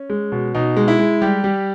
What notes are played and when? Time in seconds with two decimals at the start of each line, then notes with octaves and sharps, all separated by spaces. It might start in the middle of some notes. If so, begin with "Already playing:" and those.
Already playing: C#4
0.10 G#3
0.32 B2
0.55 B2 D#4
0.76 G#3
0.88 E4
0.99 G#3
1.22 G3 G4
1.44 G3